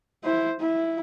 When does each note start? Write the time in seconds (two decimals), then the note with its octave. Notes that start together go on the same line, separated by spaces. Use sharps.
0.24 E4 C5
0.60 E4